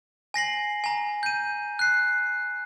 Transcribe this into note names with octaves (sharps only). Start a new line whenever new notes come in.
G#5 A#6 C7 F#7
G#5 A#5
G6 D#7
F#6 C7